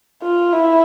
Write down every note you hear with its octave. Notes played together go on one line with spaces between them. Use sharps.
F4
E4